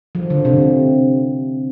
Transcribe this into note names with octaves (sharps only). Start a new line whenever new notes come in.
F3
D3
C3